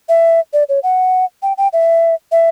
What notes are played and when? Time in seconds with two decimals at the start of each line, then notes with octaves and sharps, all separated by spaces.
0.09 E5
0.53 D5
0.69 C#5
0.83 F#5
1.43 G5
1.58 G5
1.73 E5
2.32 E5